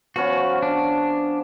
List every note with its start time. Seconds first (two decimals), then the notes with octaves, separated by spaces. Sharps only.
0.16 F3 B3 C#4 F#4
0.62 D4